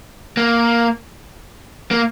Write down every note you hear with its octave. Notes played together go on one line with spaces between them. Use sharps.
A#3
A#3